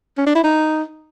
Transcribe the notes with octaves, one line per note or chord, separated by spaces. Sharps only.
C#4
D4
E4
D#4